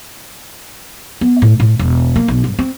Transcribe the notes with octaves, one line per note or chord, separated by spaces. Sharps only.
B3
A2
A2
E1
A#3
B1
G2
C4